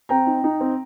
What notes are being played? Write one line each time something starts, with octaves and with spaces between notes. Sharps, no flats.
C4 G5 A#5
D#4
D#4
C4